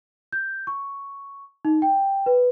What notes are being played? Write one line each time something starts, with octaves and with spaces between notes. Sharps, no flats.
G6
C#6
D#4
G5
B4